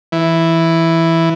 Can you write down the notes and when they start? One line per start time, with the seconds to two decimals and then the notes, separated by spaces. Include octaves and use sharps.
0.12 E3